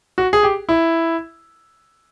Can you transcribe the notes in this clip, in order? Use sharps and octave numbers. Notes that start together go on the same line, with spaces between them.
F#4
G#4
G4
E4